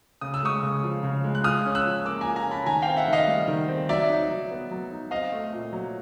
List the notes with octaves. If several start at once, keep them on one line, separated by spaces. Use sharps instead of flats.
C#3 D#6
E6
G#3 C#6 D#6
C#3
F3
C#3
G#3
F#6
F4 D#6 F6
C#4
E6 F#6
F3
A#3 D6 E6
G#5 A#5
F4
G#5 A#5
C#4
A5 B5
D#3 G#5 A#5
C4 F5 G5
E5 F#5
D#3 D#5 F5
G3
D#3
C4
F#3 D5 E5
D#4
F#3
B3
F#3
D#4
C4 D#5 F5
A3
A#2
F#3